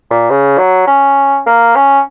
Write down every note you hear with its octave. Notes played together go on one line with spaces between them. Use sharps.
A#2
C#3
F#3
C#4
A#3
C#4